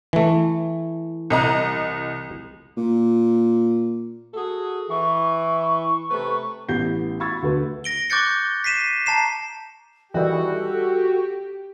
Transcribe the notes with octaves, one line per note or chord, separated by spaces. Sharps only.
E3 A3
C2 D#5 A#5
A#2
F#4 G#4 A4
E3 C#6
C3 A3 B4
A1 B3 G4 G6 C7
B5 C#6 E6 G#6 A6
D2 F#4 B4
A#6 D7 G7
C#6 D6 F#6 G6 A6 C#7
B6 C7 D#7 E7
A5 A#5 C7 E7
D#3 E3 G3 F#4 G4 A4